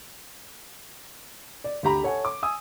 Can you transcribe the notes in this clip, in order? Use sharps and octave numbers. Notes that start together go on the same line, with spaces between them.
D5
D2 G4 A#5 B5
A4 C#5 F#5 G#5
D6
G#5 D#6 E6